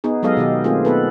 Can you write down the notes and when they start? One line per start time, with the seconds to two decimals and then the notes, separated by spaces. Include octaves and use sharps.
0.04 B3 D#4 G#4
0.23 F#3 G#3 B3 A4 D#5 F5
0.37 B2 D#3 G4
0.64 A3 A#3 C4 F4 G#4
0.85 B3 A4 B4